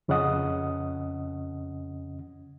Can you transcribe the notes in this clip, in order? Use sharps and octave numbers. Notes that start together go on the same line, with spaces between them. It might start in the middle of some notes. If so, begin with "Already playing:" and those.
F2 C#3 C#4 D#5 F#5 D#6